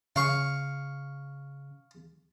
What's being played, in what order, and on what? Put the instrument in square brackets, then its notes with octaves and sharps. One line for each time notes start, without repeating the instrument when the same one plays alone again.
[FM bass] C#3 [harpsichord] F5 C#6